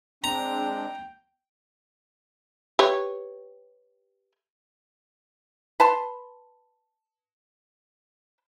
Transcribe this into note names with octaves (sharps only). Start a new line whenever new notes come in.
G#3 C4 D4 G5 A#5
G4 B4 C#5
B4 A5 C6